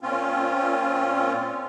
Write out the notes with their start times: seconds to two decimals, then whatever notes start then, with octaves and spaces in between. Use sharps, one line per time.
0.01 A#2 C4 C#4 F4